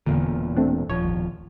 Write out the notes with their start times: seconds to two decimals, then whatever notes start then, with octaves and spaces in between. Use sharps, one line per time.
0.06 E1 E2 A#2 D3
0.56 A3 C4 D4
0.90 D#1 F3 C#5
1.05 G#1